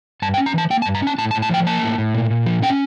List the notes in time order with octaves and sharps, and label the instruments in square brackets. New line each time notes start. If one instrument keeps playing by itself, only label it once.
[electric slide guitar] G2 A5
G5
C#4
A#5
E3 A5
A#3 G5
A5
G2
A#5
C#4 A5
A2 A5
A5
A2
A5
F3 G5
A#3 A5
A2
A2
A#2
A#2
F3
C#4 G5